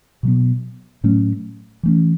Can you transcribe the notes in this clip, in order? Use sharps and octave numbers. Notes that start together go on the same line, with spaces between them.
B2 F#3 B3
A2 F#3 A3 C#4
E3 A3 C#4